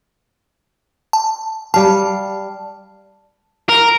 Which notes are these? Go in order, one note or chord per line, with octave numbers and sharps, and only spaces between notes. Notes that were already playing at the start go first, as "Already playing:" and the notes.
A5
G3 F5 A5
A#4